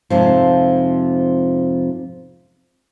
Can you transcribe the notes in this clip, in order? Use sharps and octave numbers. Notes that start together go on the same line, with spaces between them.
F2 G#2 C3 F3